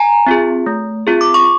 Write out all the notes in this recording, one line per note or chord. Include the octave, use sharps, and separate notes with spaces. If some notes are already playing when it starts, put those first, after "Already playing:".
Already playing: G#5 A#5
C4 F4 G#4
A3
C4 F4 G#4
D6
C#6